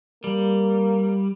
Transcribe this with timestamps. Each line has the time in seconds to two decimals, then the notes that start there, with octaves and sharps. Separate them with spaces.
0.24 G3 A#3